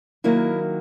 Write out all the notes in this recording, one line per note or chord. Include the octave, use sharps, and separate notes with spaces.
D#3 F#3 A#3 E4